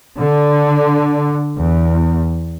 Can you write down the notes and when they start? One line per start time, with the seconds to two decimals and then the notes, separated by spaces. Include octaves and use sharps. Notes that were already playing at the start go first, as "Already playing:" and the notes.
0.18 D3
1.58 E2